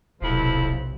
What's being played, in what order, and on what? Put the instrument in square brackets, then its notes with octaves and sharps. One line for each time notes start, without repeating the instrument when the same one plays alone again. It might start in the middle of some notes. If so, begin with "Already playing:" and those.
[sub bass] D1 [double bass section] B1 C3 [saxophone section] F2 F3 E4